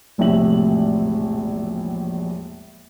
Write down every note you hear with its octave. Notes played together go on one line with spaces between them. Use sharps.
E1 A#1 A2 C3 E5 F#7